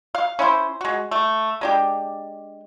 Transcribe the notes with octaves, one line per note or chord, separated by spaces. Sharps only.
F5
C#4 E4 C5
G#3 F#4
A3
G#3 D4 G4